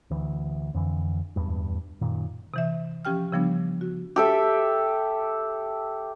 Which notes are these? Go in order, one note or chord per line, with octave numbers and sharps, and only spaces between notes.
D2 E3
F2 D3 E3
D1 E2 G2
F#2 A#2 D#3
C3 E3 E5
F3 C#4 G4 G5 F6
C#3 F3 G3 B3 D4
F#4
G4 A4 E5